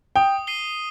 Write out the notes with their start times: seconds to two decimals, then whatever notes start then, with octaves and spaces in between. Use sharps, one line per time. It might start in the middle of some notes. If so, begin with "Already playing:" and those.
0.16 G5 D#6
0.47 C7 D#7 G7